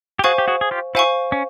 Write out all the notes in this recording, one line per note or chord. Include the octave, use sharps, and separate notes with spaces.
G4
F#4 G#4 C5 F5 G#5 C#6
G4
F#4 G#4
G#4
F4 G4
E4 F#4 C5 F5 G#5 C#6
C#4